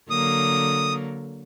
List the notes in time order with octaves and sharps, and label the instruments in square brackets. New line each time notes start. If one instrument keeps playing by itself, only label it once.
[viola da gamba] D3 F#3 A#3 [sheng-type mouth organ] D#6